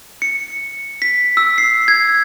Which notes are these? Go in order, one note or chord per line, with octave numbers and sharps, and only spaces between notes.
C#7
B6
E6
C7
G#6